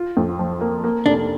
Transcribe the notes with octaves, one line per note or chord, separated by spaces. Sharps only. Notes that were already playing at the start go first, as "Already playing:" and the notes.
Already playing: F4
F2
F3
A#3
A#3
F1 D4